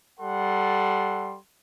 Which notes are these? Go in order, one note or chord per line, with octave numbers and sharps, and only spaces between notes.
G3 A4 F#5 C6